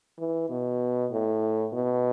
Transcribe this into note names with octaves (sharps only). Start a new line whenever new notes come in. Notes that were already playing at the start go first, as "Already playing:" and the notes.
E3
B2
A2
B2